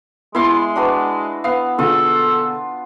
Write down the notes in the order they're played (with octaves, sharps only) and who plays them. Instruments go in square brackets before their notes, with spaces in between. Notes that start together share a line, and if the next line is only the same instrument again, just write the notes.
[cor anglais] G#3 [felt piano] B3 [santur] E4 C6 D6
[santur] D4 F#4 B4
[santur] B3 [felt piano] F5 C7
[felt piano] B2 D3 G#4 [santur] F4 [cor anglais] A4